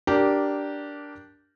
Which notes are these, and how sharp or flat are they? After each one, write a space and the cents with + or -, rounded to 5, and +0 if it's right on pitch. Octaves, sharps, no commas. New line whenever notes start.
D4 -5 G4 -15 A#4 +0